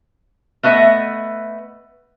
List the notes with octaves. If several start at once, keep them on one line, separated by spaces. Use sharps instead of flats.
A3 B3 B4 D#5 E5